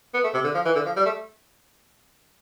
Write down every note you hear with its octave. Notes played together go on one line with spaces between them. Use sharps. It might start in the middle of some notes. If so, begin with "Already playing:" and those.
B3
A3
C3
D3
F3
E3
D3
F3
G3
A3